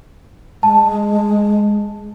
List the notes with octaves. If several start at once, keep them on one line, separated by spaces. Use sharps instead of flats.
G#3 A5